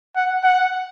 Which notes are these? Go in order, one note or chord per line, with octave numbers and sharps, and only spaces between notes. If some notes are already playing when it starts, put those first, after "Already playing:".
F#5
F#5